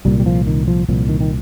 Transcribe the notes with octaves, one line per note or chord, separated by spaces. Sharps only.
C2 A#2 G3
G3
F3
D#3
F3
C2 A#2 F3
D#3
D#3